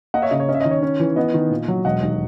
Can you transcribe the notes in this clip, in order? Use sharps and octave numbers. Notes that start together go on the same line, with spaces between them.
A#3 D#5 F#5
C#5 E5
C#3 D#5
C#5
C#4 D#5
E5
D#3 D#5
C#5
C#4
E3
B3 D#5
D#3
A#2
F#3
E1 D#5 F#5
D#2